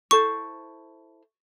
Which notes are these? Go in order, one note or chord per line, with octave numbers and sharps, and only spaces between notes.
E4 A4 C5 C#6